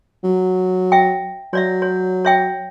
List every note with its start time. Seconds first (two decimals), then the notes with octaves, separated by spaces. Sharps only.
0.24 F#3
0.92 E5 G5
1.53 F#3 C#5 D5 E5
1.82 C#5
2.25 C#5 E5 G5